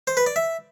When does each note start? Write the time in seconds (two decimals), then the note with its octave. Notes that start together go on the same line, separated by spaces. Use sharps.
0.07 C5
0.17 B4
0.26 D5
0.36 E5